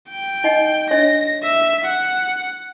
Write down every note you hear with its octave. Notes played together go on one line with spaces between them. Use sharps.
G5
D#4 D#5 F#5
D4 C#5 D#5 A#6
E5
F#5